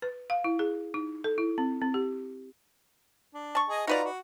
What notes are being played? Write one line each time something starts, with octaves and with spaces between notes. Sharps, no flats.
B4
F5
E4
G#4
D#4
A4
E4
C4
C4
G4
D4
A5 C#6
G#4 D#5
D#4 F4 F#4 B4 D5 A#5
F#4